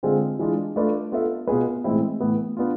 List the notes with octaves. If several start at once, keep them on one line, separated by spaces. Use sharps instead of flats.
D3 G#3 C4 F4 G#4
E3 G#3 D4 F4
A3 D4 F4 B4 D5
B3 F4 A4 E5
B2 B3 F4 G#4 B4
A2 E3 G#3 C4 E4
A2 E3 B3
B3 D4 F4